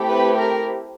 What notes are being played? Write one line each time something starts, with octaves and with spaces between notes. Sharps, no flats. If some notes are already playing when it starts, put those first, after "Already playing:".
Already playing: A3 C4 E4 G4
B4
A#4